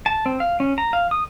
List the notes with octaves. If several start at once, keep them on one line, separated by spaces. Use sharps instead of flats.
A5
C4
F5
C#4
A#5
F5
D#6